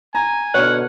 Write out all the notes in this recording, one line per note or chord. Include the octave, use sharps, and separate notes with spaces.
G#5 A#5
B2 D3 C#5 F#5 F6